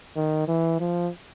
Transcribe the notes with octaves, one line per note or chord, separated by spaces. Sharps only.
D#3
E3
F3